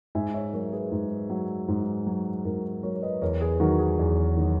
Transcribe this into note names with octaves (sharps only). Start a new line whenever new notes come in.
G#2 E5 G#5
C#5 E5
F#3 A#4 C#5
G#4 B4
G#2
F#3
G#2
F#3
G#2 F#4 A#4
F#3 A#4 C#5
C#5
B4 D#5
E2 A#4 C#5
G#4 B4
D#3 F#3 F#4 A#4
G#4
E2 G#4
D#3 F#3